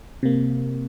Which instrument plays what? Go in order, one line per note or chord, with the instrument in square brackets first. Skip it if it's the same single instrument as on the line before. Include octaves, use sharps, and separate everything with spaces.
[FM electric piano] C3 A#3